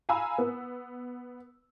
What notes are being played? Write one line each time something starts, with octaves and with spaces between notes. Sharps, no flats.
F5 G#5 A#5 B5 E6
B3